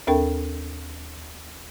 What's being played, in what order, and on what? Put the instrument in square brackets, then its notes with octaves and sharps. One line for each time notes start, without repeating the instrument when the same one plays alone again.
[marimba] D#2 C4 D4 A4 A#4 G5